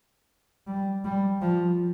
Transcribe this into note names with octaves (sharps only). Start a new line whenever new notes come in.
G3
G3
F3